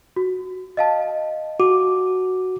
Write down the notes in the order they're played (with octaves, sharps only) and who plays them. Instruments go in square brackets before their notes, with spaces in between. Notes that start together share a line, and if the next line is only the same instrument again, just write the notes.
[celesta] F#4
D#5 F5 A5
[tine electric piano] F#4 [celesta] D6